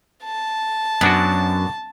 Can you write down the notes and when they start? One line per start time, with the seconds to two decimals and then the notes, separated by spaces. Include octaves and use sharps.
0.23 A5
1.01 F#2 B3 D4 F#4